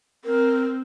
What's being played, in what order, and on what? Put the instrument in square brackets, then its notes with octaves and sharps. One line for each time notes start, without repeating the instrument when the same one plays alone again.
[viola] C4 [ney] A#4